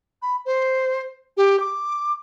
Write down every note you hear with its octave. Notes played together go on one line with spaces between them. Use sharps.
B5
C5
G4
D6